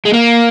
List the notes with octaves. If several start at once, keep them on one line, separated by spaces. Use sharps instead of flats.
G#3
A#3